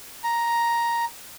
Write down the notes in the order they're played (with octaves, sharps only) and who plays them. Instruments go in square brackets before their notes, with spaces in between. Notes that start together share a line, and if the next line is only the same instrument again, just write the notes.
[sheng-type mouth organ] A#5